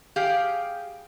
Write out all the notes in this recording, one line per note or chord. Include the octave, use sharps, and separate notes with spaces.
G4 G#4 F5 G5